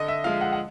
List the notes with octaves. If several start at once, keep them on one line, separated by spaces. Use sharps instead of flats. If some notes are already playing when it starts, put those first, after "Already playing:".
Already playing: D3 D#5
E5
F3 G#3 F5
F#5
F#5